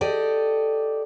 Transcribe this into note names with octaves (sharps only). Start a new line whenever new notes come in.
G4 A4 D5 D#5